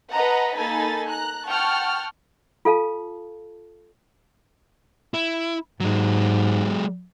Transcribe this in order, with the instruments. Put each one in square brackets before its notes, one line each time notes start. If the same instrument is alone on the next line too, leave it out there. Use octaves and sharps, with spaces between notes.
[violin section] B4 D#5 F#5 A5 A#5
A#3 D#4 A4 G#5 B5 A6
A#5 F#6
F#5 G5 A5 C#6 F6
[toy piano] F4 A4 F5 A5
[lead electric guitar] E4
[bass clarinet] G#2 [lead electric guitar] F#3 G#3